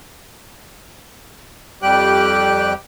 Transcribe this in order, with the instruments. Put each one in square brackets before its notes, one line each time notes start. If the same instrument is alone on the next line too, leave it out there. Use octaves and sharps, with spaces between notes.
[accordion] F2 G3 G4 G5 F#6